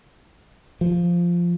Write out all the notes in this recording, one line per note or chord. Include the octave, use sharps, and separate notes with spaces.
F3